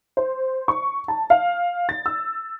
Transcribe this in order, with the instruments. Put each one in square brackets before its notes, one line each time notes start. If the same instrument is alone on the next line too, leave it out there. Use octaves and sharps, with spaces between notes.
[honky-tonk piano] C5
C#6
A5
F5
A6
E6